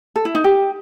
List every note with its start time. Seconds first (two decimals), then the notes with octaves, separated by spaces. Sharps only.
0.16 A4
0.25 E4
0.35 D#4
0.44 G4